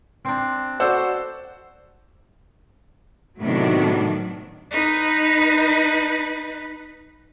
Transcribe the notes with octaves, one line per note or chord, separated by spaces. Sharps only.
C4 D4
F#4 A4 C5 D5 F#5 E6
A2 C3 D#3 F#3 B3 D4
D#4 B4